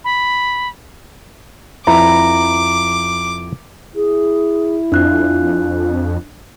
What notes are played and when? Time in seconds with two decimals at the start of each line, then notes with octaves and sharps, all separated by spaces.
0.04 B5
1.87 F2 E4 B4 A#5 D6
3.95 E4 G#4
4.92 F2 D4 F4 F#6